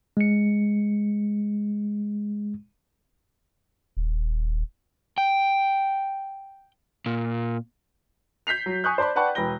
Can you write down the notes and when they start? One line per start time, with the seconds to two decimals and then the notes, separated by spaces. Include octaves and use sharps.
0.17 G#3 C#7
3.97 D#1
5.18 G5
7.06 A#2
8.47 G6 B6 C7 F7
8.66 F#3
8.84 G#5 C#6 D#6 F#6 G6
8.98 C5 D5 A5 B5 C6
9.16 B4 D5 F#5 G5 A5 C#6
9.35 E1 B4 G5 A#6 G7